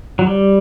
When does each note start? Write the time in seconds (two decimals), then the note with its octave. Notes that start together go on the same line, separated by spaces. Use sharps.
0.19 F#3
0.27 G3